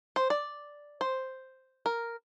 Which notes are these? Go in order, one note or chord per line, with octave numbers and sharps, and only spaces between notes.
C5
D5
C5
A#4